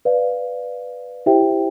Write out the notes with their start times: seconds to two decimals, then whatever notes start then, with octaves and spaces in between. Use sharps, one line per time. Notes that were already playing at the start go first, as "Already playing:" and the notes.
0.05 B4 D5 F5
1.26 E4 G4 C5 E5 G5